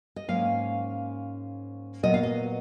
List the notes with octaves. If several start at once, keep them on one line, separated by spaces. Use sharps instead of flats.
D#5
G#2 F#3 A#3 C#4 F5
A#2 F#3 B3 D#5
F5
D#5